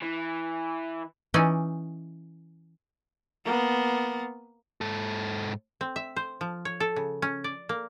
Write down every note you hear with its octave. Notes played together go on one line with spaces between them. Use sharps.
E3
E3 C#4 D#4 D5 D#5
A#3 B3
G#2 A4
C4
E5
C5
F3
C#5
A4
C#3
C#4
D5
A#3